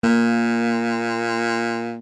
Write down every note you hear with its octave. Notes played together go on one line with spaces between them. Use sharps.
A#2 A#3